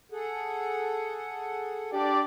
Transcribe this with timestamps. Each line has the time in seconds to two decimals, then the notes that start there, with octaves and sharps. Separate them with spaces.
0.12 G#4 A4 F#5
1.92 D4 G4 D5